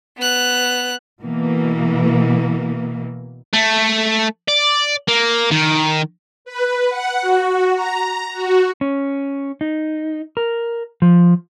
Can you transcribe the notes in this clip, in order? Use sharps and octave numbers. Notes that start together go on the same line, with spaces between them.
B3 F#6
B2 E3 A#3
A3
D5
A#3
D#3
B4
F#5
F#4
A#5
F#4
C#4
D#4
A#4
F3